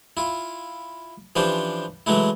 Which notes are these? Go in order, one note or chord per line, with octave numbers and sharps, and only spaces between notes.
E4 F4
E3 F3 C#4 D4 G4 C5
E3 F#3 G#3 A3 E4